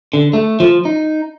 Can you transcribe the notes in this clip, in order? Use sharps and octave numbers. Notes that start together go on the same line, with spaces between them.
D3
A3
F3
D#4